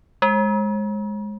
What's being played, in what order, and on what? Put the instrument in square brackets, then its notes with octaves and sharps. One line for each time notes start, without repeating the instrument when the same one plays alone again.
[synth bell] G#3